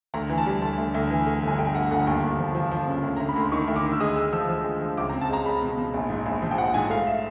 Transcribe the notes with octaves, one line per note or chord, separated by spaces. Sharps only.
D2 A#5
E3
A5
G3
D2 A5
D2
D2
E3
A3
G1
G#5
A3 G5
A3 F#5
G1 F#5
D#2 G5
D#2
F3
F3
F3
C#3
D2
D2 A#5
B5
D2 C6
D#3 C#6
D2
D6
D#3
E6
G#3 D#6
G#3 E6
F3 E6
F3
G#3
F3
C#2 D6
C4 A#5
A5
G#3 A#5
G#3 B5
B2
B2
A#1
G#2
A#1
F3
G5
A#1 F#5
G#2 G#5
A3 F5
E5